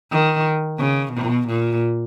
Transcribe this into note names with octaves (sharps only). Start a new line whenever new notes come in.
D#3
C#3
B2
A#2